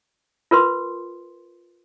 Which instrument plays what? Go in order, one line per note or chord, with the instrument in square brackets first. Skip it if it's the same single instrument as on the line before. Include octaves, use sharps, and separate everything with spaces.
[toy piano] F4 A#4 B4 C6